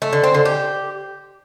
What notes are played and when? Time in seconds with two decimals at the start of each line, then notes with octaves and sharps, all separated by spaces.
0.02 A3
0.13 D3
0.24 C4
0.35 D3
0.45 G4